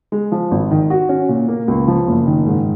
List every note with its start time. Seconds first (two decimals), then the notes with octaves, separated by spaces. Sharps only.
0.12 G#3
0.32 F3
0.51 G#1
0.71 D#3
0.90 F#4
1.09 C#4
1.29 A#2
1.48 A#3
1.68 C#2
1.88 F3
2.08 F#1
2.26 D#3
2.46 G#2